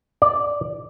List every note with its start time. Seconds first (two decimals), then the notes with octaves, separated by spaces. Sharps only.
0.22 D5